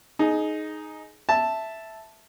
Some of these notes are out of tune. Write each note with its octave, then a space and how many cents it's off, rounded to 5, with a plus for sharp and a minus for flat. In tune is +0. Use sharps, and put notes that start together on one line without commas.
D#4 +0 G#4 +20
E5 +0 A5 +0